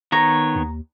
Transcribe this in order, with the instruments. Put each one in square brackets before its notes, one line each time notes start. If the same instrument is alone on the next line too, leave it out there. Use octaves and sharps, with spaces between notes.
[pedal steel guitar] D#3 B3 C#5 [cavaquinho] A#5
[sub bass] D#2